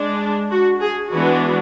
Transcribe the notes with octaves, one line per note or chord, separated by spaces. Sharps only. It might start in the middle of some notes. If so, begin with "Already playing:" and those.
Already playing: G#3 D4
F#4
G#4
E3 G#3 B3 D4 F#4